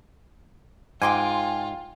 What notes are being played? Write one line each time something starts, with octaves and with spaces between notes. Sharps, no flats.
G#2 F4 G5 G#5 C6 D6